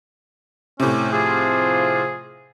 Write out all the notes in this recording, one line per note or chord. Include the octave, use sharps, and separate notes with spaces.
A2 C3 C#4
F3 F4 G#4